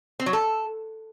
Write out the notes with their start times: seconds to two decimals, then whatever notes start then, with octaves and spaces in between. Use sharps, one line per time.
0.20 C4
0.26 F#3
0.33 A4